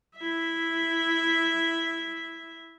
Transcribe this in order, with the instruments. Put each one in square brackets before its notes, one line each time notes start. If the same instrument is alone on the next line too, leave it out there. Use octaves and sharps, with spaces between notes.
[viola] E4 E5